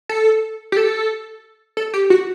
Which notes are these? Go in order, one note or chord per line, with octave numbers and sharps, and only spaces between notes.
A4
G4
A4
A4
G4
F#4